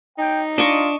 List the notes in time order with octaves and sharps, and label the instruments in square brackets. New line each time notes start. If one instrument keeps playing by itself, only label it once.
[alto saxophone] D#4 [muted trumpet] G5
[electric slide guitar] D4 [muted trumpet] F4 [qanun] D#5 C#6